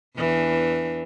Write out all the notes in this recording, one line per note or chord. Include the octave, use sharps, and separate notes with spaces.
E2 E3 D4